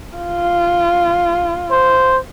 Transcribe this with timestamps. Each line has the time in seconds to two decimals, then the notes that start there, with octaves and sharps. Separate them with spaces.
0.17 F4
1.71 C5